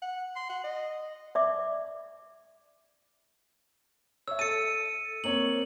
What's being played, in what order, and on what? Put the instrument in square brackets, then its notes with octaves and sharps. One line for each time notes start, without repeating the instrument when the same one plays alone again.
[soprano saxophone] F#5
C6
F#5
D#5
[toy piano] D5 E5 D6
[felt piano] C#5 E5 [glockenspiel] E6
[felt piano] A4 A6 [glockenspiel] C#7 D#7
[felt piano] A#3 C4 C#5 [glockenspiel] F#7